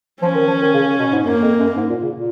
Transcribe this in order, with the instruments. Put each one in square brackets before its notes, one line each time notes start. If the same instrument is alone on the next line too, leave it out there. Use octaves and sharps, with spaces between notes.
[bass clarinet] F3 [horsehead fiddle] C#4
[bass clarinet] D#3
F3
D#3
C#3
B2
G#2
[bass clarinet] F#2 [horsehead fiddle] A#3
[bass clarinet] F2
F#2
G#2
A#2
C#3
A#2